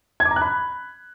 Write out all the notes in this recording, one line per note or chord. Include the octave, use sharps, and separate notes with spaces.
G#6
D6
A#5
F#6
B5